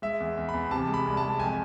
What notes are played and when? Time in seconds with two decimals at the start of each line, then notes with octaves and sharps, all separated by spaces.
0.02 G#3 E5
0.20 E2
0.37 E2
0.49 E2 B5
0.71 C3 A5
0.87 G#3
0.94 B5
1.05 C2
1.17 A5
1.23 G#3
1.39 F2 G#5